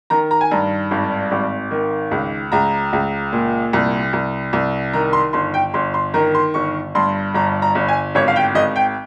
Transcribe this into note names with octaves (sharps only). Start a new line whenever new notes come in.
D#3 A#5
A#5
G#5
G2 A#5
G#1
G#1
D#3
C#2
C#2 A#5
C#2
A#2
C2
C2
C2
D#3 A#5
C6
G1 C6
G5
G1 C6
C6
D#3 A#5
C6
G1 C#6
G2 C6
G1 A#5
A#5
G1
G#5
G#1 C#5
F5
G5
G#1 D#5
G5